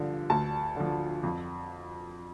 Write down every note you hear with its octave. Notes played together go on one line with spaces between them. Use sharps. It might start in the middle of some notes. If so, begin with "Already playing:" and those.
Already playing: G2 D3 F3
D2 A5
D3 F3
F2